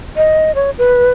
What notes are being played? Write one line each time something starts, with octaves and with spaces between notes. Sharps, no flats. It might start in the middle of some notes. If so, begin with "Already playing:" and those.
D#5
C#5
B4